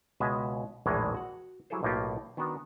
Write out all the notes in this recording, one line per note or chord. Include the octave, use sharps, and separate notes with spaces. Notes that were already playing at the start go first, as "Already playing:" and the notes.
C#2 B2 G#3 E5 G#5
A#1 E2 A2 D#3 E3 G#3
F#4 F#5
F#3 G3 E4 G#4 A4 C5
B1 A2 A#3 D#4 F4 G4
D#3 B3 D4 F#4